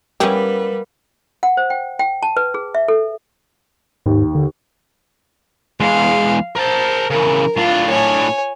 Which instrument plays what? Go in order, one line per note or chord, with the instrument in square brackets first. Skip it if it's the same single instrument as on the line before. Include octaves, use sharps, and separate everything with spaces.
[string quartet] G3 B4 [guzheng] A#3 B3 E4 [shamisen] C#4 G4
[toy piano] F#5
C5
G5
G5
A5
B4
G#4
E5
A4
[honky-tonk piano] D#2 [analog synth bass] G#2
[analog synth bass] D3
[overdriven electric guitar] E2 G#3 [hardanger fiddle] F5
[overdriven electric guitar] A#4 A5 [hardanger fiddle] C5
[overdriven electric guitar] C#3 E3 [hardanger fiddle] A#4
[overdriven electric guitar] A2 D4 [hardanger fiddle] F4
[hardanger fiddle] C#5 G#5